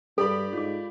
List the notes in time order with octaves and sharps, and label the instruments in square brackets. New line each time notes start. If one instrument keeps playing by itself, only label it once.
[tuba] G2 [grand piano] G4 D5 B5 [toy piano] A4
[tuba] G#2 [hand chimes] F4 D6